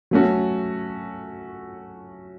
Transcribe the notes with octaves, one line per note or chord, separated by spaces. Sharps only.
F#3 A3 C#4 F#4